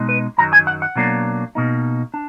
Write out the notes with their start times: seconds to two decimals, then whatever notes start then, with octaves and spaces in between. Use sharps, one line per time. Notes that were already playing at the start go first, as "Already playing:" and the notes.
Already playing: B2 G#3 D#4
0.09 B4
0.38 F#2 D#3 F#3 A#5
0.53 G#5
0.67 F#5
0.82 F#5
0.96 B2 F#3 A#3 D4
1.55 B2 A#3 D#4
2.14 D4